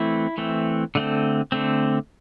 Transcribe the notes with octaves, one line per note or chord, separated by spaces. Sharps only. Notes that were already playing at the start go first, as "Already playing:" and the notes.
Already playing: E3 A3 C4 E4
E3 A3 C4
D3 A3 C4
D3 A3 C4